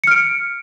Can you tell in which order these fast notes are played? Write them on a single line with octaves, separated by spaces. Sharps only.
C#7 F6 D7